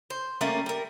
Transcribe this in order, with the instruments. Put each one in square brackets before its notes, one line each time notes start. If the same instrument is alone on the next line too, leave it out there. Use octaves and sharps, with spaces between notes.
[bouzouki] C5
G3 A3 A#3 C#4
G3 A#4